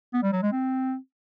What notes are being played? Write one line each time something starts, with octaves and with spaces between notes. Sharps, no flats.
B3
G3
F#3
G#3
C4